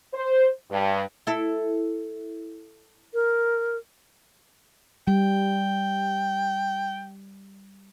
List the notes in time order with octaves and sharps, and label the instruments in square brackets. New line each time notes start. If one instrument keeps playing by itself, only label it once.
[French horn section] C5
G2
[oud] E4 A4
[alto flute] A#4
[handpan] G3 [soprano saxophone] G5